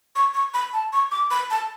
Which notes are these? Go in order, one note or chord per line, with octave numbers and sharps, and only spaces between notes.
C#6
C#6
B5
A5
C#6
D6
B5
A5